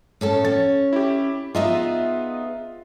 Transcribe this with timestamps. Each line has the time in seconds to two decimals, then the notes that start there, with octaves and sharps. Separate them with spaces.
0.21 A2 C#4 A4
0.45 C#4 A6
0.93 E4 G4
1.55 B3 D#4 F4 G#4 D#5 E5